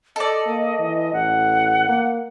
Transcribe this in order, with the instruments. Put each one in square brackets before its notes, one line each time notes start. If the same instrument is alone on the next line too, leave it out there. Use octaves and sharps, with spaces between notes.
[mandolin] A4 D5 [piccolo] D#5
[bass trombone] A#3
E3
[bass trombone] A1 [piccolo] F#5
[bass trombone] A#3